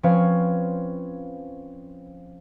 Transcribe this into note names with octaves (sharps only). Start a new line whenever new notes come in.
F3 C4 C#4 B4 C#5 F5